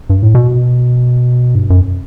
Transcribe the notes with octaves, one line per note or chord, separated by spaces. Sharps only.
G2
A2
B2
G2
F#2